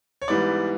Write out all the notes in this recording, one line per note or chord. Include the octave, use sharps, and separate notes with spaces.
C#5
G#2 E3 G3 B3 D5